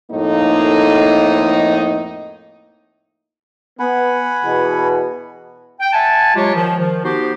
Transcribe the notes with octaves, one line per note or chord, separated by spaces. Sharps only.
F2 A2 F3 A#3 D#4 D#5
B3 F#5 G#5 B5
E2 B2
G5
E5 F#5 G#5 A5
F#3 G#3 F4 G4 C#5
D#3 F3
D#3 F3
B3 D#4 F#4 G4 C5